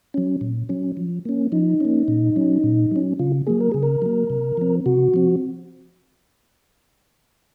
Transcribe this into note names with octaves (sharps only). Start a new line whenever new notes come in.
F#3 C#4
A#2
F#3 C#4
F3
A#3 C#4
F3 D#4
A#3 C#4
A#2
F#3 C#4
A#2
F#3 C#4
C#3 F4
F#3 A#3 G#4
A#4
C#3 G#4
A#4
F#3 A#3
C3
F3 C4
C3 F#4
F3 C4